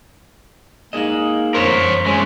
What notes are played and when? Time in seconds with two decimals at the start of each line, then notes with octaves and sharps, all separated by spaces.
0.93 A#3 D#4 G#4 D#5 E7 F#7
1.54 F#2 A#4 C5 C#5 C6 B6 E7
2.06 E3 G#3 C#4